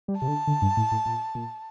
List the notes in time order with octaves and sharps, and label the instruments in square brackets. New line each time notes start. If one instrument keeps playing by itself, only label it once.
[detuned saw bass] G3
[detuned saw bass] C3 [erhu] A5
[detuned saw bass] D3
D3
G2
A2
A2
A#2
A#2